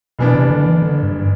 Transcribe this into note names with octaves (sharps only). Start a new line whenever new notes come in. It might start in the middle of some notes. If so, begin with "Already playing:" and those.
F#1 F#2 B2 E3 B3 D4
C3
D3
E3
D3
G2